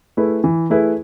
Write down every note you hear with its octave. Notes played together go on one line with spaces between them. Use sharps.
A3 E4 G#4 B4
E3
A3 E4 G#4 B4